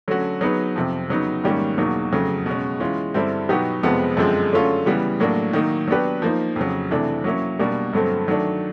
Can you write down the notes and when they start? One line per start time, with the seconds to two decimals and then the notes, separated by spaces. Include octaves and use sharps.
0.08 D3 F#3 A3 C#4 F#4
0.41 F#3 B3 D#4 G#4 B4
0.76 F2 C3 F3
1.09 C#3 F#3 B3 D#4
1.44 G#2 D#3 G3 A#3 C#4
1.78 E2 B2 F#3 A#3 D#4
2.12 F2 C#3 F#3 A3
2.46 B2 G#3 C#4
2.80 E3 G#3 C#4 F4
3.14 G2 D3 G3 C4 E4
3.49 B2 F#3 B3 D#4 G4
3.83 F2 C3 F3 G#3 B3
4.17 F#2 D3 F3 G#3 C4
4.52 D3 F#3 A3 C#4 F4
4.86 C#3 E3 G3 B3
5.20 A2 F#3 A#3 D4
5.53 D#3 F#3 A#3 D#4
5.88 F#3 B3 D4 G4 B4
6.22 F3 A#3 D#4
6.56 F2 C#3 F#3
6.91 C3 E3 A3 D4
7.24 F#3 A#3 C#4 E4
7.59 B2 G3 A#3 D4
7.93 G2 D3 F#3 A3 C4
8.27 D#3 F#3 A3 D4